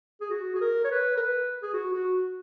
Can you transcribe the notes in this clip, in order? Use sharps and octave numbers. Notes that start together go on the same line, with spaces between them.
G#4
F#4
G#4
A#4
C#5
B4
A#4
B4
G#4
F#4
F#4